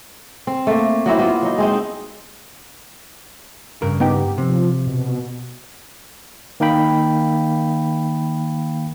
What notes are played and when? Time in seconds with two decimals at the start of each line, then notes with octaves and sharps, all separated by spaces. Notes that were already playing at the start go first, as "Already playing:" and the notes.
0.47 C4
0.67 A3 A#3
1.06 F#3 A#3 C4 E4
1.19 A#3 B3 E4 F4
1.42 F#3 D#4
1.58 G#3 C4 D#4
3.82 G2 C#3 A#4
4.00 B3 D#4 G4
4.38 C3 F3
4.87 B2
6.60 D#3 A#3 D#4 F5 G5 B5